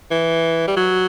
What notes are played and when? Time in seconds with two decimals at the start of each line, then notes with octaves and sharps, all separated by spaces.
0.11 E3
0.68 G3
0.77 F#3